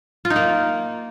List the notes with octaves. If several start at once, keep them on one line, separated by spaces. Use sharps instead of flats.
F4
D#4
A#3